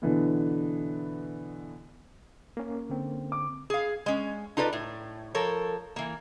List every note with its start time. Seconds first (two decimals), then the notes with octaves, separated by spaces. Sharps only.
0.02 B2 D3 E3 B3
2.57 A#3 C#4
2.90 D3 C4
3.32 D6
3.70 G#4 F5
4.06 G#3 C#4
4.57 D#4 F4 A4 B4 D5
4.73 A2
5.35 F3 A4 A#4 C#5
5.96 E3 A#3